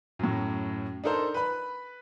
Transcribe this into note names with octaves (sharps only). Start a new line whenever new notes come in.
F#2 A2
D4 D#4 A4 A#4 C5
B4 B5